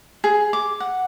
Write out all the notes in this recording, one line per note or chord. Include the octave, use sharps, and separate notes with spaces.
G#4
D6
F#5